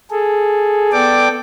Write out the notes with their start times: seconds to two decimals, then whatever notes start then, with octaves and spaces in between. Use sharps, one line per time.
0.11 G#4 A4
0.92 B3 A4 D5 G5 D6